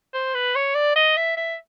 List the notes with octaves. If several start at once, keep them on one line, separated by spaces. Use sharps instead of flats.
C5
B4
C#5
D5
D#5
E5
E5